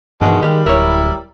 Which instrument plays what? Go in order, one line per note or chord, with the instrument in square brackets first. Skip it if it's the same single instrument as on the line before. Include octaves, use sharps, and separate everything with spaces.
[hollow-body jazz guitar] E2 D#3 [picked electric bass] G2 E3 [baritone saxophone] B2 [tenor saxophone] G#3
[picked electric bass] D#3 [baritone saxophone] G3 [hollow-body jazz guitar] G4 F5
[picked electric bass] D1 [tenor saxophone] E4 [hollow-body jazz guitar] A#4 C#5